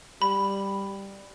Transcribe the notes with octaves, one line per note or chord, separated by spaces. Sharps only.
G3 B5